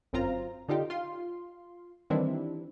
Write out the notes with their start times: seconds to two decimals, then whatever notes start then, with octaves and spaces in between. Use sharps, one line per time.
0.13 G1 F#2 C4 F4 A#5
0.68 D3 D#4 F4 G4
0.90 F4 C6
2.10 D#3 E3 G3 C4 D4 E4